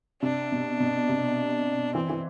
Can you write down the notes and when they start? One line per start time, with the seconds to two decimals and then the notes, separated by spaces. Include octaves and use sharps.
0.23 C3 D4
0.52 B2
0.80 B2
1.09 C3
1.95 E3 C4
2.10 E3